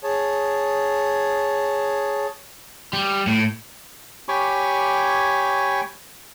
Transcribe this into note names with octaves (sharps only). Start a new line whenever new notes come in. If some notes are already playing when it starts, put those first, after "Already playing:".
G#4 C#5 A5
G3
A2
G4 C#5 G#5 B5 C#6 D6